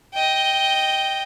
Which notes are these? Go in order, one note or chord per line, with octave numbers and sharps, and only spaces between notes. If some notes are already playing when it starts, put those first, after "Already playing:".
D#5 G5